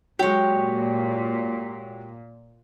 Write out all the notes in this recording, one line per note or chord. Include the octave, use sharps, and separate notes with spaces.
A#2 F#3 G#3 G4 C#5